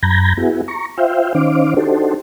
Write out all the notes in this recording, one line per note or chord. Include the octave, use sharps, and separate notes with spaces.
F#2 A#5 B5 G6 G#6 A#6
B3 E4 F#4 G#4
A#5 C#6
F4 C5 E5 F5 G5
D#3 C#4 D#4 C5 F5 D6
D4 D#4 F#4 G4 A4 C5